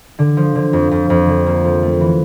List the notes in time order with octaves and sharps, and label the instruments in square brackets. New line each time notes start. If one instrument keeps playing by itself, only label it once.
[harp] D3
F3
D3
F2
F2
F2
D3
A#3
F3
A3
E3